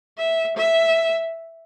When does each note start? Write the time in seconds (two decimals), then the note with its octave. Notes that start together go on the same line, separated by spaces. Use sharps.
0.18 E5
0.57 E5